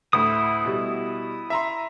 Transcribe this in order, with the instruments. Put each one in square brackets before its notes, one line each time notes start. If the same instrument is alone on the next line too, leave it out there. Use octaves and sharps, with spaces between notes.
[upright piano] D2 A2 [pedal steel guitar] E4 D#6
[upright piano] B2 G3
E5 A#5 C6